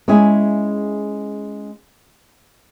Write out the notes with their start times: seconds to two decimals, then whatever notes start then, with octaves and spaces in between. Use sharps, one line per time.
0.08 G#3 C#4 E4 G#4